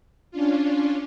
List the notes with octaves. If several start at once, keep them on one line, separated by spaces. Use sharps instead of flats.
C#4 D4 F4